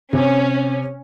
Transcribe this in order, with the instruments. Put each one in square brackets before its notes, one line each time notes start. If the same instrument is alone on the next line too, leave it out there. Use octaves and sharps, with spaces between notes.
[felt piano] C3 [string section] C#4